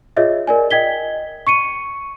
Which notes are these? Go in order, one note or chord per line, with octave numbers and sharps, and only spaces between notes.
F4 G#4 C#5 D#5 E5
A#4 D5 G#5
D#5 G5 G#6 B6 G7
C#6 C#7 D#7